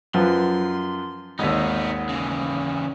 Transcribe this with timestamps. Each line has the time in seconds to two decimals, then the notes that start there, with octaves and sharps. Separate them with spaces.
0.14 F#2 F3 B4 C6
1.39 G#1 D#2 B3 D#4
2.09 C#3 E3